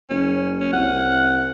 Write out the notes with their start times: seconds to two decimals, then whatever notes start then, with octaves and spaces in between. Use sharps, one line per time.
0.10 F#1 C#4
0.60 C#4
0.73 C2 F#5